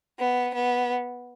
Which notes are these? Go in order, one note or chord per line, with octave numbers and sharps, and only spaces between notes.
B3
B3